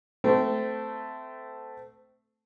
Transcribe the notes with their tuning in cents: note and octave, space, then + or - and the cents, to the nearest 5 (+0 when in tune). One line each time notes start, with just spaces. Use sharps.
A3 +0 C4 -25